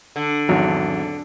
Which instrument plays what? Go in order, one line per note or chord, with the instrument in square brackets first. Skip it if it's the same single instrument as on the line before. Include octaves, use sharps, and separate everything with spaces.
[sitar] D3
[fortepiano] G#1 E2 F#3